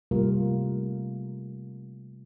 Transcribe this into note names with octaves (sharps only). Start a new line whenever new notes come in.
C3 G3 A3 A#3 F4 A#4